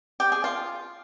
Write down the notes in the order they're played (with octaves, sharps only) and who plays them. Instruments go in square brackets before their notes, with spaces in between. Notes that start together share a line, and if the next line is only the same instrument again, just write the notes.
[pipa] G4
G#4
F4